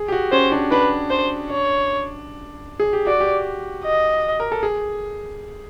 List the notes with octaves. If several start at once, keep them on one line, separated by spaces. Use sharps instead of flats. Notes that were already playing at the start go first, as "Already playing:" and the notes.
Already playing: G#4
G4
F#4
C#4 C5
D4
D4 B4
C5
C#5
G#4
G4
F#4 D5
G4
D#5
A#4
A4
G#4